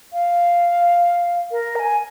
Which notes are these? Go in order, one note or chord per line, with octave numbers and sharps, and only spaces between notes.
F5
A#4
A#5
G#5